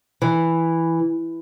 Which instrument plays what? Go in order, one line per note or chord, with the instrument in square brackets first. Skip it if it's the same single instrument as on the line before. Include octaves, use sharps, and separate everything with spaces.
[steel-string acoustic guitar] E3